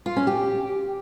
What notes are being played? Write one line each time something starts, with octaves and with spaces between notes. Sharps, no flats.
F4
C#4
G4